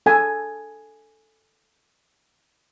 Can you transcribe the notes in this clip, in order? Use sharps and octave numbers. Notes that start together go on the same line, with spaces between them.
A4 G#5